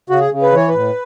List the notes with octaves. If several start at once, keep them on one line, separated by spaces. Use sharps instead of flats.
C#3 F#4
G#4
C#3
B4
E3 C#5
B4
A2